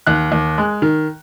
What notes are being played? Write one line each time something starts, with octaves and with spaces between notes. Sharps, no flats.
D#2 F#6
D#2
G#3
D#3